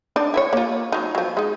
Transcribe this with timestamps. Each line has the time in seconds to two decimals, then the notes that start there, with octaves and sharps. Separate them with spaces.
0.16 D4 D#4 D5
0.34 E4 B4 C#5
0.53 A#3 F4
0.92 F#3 D#4
1.15 F3 F#3
1.37 G#3 D#4